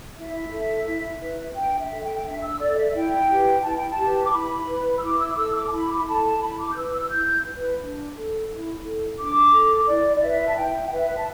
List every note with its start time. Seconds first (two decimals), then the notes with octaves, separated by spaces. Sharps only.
0.17 E4 E5
0.51 A4
0.86 E4
1.22 B4
1.56 D4 G5
1.79 E5
1.91 A4
2.03 G5
2.15 G5
2.26 D4 E5
2.43 E6
2.60 A4 D5
2.77 E5
2.94 E4 G5
3.30 G4 B4
3.64 E4 A5
3.76 G5
3.89 A5
3.98 G4
4.03 B4
4.25 D6
4.33 E4 B5
4.67 B4
4.98 E6
5.03 E4 D6
5.19 E6
5.32 D6
5.37 A4 E6
5.55 D6
5.67 A5
5.71 E4 B5
5.91 D6
5.99 B5
6.06 A4 A5
6.42 E4 B5
6.59 D6
6.72 G6
6.76 B4 E6
6.93 E6
7.10 E4 G6
7.46 B4
7.80 D4
8.15 A4
8.49 E4
8.84 A4
9.19 D4 D6
9.53 A4
9.88 E4 D5
10.16 D5
10.22 B4 E5
10.48 A5
10.57 E4 G5
10.85 G5
10.91 B4 E5
11.17 A5